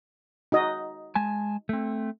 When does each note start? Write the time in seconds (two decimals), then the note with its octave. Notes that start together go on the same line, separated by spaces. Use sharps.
0.52 D#4 F#4 D#5
1.15 G#3 G#5 A5
1.69 A3 C4